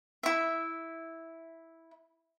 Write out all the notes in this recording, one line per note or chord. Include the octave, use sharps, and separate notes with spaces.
E4 E5